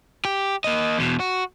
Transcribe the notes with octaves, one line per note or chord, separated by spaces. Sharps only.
G4
A#3 D#5
E2 B2
F#4